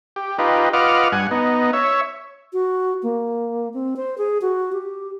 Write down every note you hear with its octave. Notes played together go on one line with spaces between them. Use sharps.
G4
D#4 F4 G4 B4
F4 B4 D#5 F#5 D6 F6
G2 F#5 G#5
B3 D#4
C#5 E5
F#4
A#3
C4
C5
G#4
F#4
G4